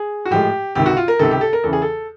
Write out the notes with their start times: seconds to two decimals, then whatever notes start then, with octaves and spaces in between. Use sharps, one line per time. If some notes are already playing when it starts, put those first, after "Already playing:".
Already playing: G#4
0.25 F#4
0.31 A2 F3 G#3 G4
0.75 C#2 C3 D#3 G4
0.86 F#4
0.97 F4
1.08 A#4
1.19 C#2 C3 D#3 A4
1.31 G4
1.41 A4
1.53 A#4
1.64 E2 C#3 E3 A4
1.73 G#4
1.82 A4